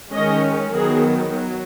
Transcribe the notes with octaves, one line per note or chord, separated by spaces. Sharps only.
D#3 G#3 C#4 D#5
D#3 F#3 B3 G#4
F#3